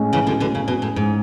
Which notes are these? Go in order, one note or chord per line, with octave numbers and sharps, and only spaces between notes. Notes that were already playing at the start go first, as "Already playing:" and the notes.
Already playing: A2 G#3 C#4
C#3 E3
B2 D3
B2 D3
C#3
B2
A2
G#2